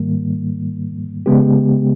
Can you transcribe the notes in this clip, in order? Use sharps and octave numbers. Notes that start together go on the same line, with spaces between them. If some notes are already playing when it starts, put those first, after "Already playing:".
Already playing: G#2 D#3 G3 A#3
C#3 G#3 B3 G4